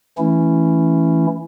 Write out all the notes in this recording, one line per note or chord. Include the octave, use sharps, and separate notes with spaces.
E3 A3 C#4 E4